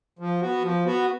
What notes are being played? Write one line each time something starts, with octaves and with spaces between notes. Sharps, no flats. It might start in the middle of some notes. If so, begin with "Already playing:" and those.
F3
B3 F#4
F3
B3 F#4